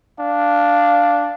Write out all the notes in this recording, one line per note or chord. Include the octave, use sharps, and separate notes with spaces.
D4 F5